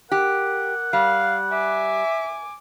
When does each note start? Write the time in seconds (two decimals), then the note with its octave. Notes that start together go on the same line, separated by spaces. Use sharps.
0.12 G4 A#4 F#5
0.93 G3 F5
1.52 E5 G#5 D6